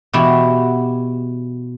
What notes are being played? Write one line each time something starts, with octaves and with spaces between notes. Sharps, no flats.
B2 E3 E4 F#4 G4